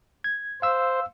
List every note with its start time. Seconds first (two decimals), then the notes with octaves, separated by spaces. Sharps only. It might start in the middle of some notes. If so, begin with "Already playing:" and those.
0.24 G#6
0.62 C5 F5 E6